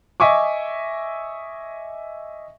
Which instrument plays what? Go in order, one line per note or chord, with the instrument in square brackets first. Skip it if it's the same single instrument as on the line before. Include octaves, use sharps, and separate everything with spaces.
[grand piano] D#5 E5 G#5 C#6 D6